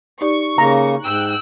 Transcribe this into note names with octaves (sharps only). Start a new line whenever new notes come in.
D#4 G4 D5 C#6
C#3 A#3 A#5
G#2 G5 E6 F#6